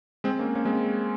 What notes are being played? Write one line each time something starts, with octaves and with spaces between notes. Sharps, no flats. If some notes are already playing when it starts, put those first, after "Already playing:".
G#3 C4
A#3 C#4
A#3 C#4
G#3 C4